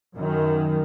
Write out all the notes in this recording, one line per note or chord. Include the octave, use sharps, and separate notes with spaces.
F#2 D#3